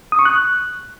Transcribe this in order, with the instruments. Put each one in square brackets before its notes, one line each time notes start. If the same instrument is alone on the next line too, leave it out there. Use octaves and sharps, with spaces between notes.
[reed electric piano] D#6
C#6
F#6